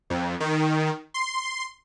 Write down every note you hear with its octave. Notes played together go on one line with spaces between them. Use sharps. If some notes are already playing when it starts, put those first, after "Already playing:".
F2
D#3
C6